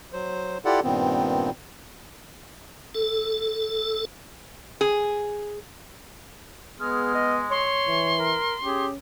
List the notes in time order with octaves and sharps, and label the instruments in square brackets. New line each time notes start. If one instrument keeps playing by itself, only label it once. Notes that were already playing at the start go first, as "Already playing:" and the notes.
[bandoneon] F#3 C5
E4 F4 G4 A4 D5 F#5
G2 A#2 D#3 B3 C4
[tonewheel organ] A4
[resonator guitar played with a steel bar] G#4
[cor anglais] G#3 [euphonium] B3 [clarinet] G#4 [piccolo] F6
[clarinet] D#5
[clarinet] C#5 [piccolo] C6
[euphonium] E3
[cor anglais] A#4
[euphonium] C#4 [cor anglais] G4 [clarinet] G#4